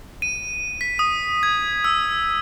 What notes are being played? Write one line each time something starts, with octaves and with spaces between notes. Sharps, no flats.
D#7
B6
D#6
G#6
E6